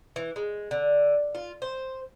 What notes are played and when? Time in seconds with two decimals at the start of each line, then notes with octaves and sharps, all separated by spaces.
0.16 E3
0.36 G#3
0.71 D3
1.35 F4
1.62 C5